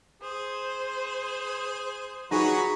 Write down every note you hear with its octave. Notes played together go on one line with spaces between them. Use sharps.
G#4 C5
F#3 D#4 F4 F#4 G#4 B4 G#5 A#5